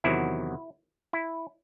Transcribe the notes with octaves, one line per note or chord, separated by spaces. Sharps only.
E2 C3 D#3 F#3 E4
E4